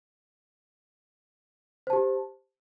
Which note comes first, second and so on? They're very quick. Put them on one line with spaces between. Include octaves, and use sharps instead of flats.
C5 A5 G4